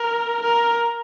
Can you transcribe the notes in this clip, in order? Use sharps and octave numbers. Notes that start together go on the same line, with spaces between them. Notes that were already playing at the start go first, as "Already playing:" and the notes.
Already playing: A#4
A#4